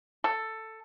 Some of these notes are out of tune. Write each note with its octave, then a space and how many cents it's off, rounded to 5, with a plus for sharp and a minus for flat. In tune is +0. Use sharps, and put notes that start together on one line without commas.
A4 +10